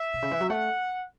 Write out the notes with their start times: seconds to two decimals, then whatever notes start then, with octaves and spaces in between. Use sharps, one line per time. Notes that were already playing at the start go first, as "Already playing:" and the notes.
Already playing: E5
0.13 B2
0.22 C#3
0.31 E3
0.41 F#3
0.49 A3 F#5